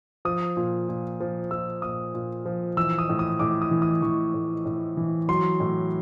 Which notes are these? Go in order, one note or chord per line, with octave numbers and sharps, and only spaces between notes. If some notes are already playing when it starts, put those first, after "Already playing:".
F3 D#6
A#2
A#2
F3
F3 E6
A#2 D#6
A#2
F3
E3 E6
D#6
A2
D#6
A2 D6
D#6
E3
D#6
E3 C#6
A2
A2
E3
F#3 C6
A2